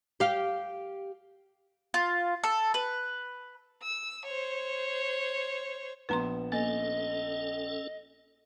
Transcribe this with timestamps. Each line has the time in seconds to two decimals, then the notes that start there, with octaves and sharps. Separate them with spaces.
0.20 G4 F5
1.94 F4
2.44 A4
2.74 B4
3.83 E6
4.25 C5 C#5
6.09 A#1 B3 B4 A#5 C6 E7
6.52 A#3 C#4 A4 D#5